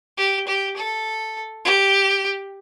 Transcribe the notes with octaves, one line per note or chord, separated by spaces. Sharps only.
G4
G4
A4
G4